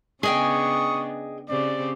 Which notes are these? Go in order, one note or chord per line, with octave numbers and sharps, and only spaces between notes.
C#3 B3 D4 G#4 D#5 G5 C#6 D#6
C#3 C4 G4 D5